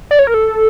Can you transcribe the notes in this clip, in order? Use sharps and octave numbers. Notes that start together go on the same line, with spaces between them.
D5
C#5
A#4
A4